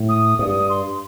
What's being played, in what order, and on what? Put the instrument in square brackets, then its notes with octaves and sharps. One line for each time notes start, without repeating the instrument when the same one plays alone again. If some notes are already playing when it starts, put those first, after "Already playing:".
Already playing: [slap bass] A2
[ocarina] D#6
[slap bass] G2 [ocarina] D#6
[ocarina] C6